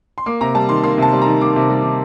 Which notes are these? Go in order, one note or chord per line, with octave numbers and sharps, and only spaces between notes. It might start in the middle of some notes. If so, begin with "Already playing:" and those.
C6
A#3 D6
C3 A#5
G3 A5
D#3 C6
A#3 C6
C3 A5
G3
D#3 A#5
A#3 D6
C3
G3
D#3